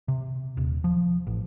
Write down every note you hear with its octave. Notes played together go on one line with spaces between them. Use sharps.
C3
D#1
F3
A1